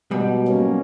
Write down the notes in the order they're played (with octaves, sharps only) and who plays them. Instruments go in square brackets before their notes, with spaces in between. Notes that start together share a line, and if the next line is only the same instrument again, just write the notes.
[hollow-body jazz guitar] G#2 G3 [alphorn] B2
[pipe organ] F#3 A#3 C#4